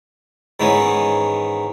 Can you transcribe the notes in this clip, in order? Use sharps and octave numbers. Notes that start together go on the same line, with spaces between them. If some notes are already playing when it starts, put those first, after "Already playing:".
G#2 D#3 E3 B3 C#4